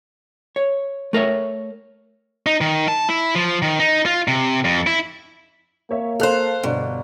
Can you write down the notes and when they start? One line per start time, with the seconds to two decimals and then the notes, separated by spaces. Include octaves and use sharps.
0.56 C#5
1.13 A3 A#4 C#5 E5
2.46 D#4
2.61 D#3
2.88 A5
3.09 E4
3.35 F3
3.62 D#3
3.80 D#4
4.06 F4
4.28 C3
4.65 F2
4.87 E4
5.91 A#3 C#5 E5
6.20 A4 C5 F5 F#6
6.63 G1 B2 D4